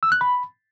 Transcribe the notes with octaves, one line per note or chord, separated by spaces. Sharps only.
E6
F#6
B5